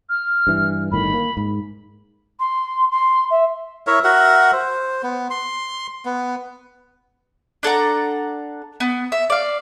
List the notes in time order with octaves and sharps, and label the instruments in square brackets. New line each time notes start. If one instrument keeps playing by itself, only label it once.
[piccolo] F6
[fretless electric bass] G2 E3
[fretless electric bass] G1 A2 D#3 [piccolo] B5
[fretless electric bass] A#3
G#2
[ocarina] C6
C6
E5
[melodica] E4 A#4 C#5 E5
F#4 A#4 E5 F#5
C5
B3
C6
B3
[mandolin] D4 A4 F#5 A#5
B3
E5
D5 F5